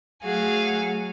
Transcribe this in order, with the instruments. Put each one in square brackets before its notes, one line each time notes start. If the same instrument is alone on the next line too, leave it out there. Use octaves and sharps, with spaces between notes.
[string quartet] F#3 A3 F#4 G#4 F5 G#5